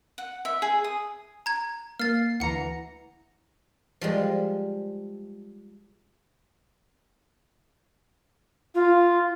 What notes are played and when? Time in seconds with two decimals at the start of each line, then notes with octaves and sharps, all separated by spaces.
0.18 F#5
0.45 E5
0.62 G#4
0.84 D#6
1.46 A#5 G#6
2.00 A#3 F6 A6 C7
2.40 D2 E3 F#5 A#5 C#7
4.01 F3 G3 G#3
8.75 F4